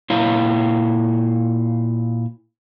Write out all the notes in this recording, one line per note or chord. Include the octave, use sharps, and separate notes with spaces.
A#2 E4 C#5 F5